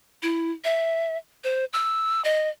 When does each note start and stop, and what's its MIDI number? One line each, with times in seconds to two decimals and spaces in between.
0.23 0.51 64
0.64 1.17 76
1.44 1.65 72
1.73 2.22 88
2.25 2.49 75